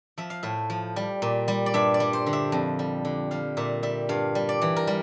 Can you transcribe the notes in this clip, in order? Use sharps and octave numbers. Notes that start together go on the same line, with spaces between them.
F3 E5
F5
A2 E5
F3
G3
A#2
G3
D5
G2 E5
D5
G3
C5
D3
E5
F2
G3
D3
G3 F5
A#2 E5
G3 E5
G2 F5
G3
D5
E3
A#4
G3